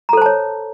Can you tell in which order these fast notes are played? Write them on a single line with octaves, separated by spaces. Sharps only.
A#5 A4 C5 A5 C#5